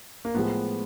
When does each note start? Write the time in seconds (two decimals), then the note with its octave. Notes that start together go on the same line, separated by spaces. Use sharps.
0.25 A#3
0.35 A2 F3 G#3 B3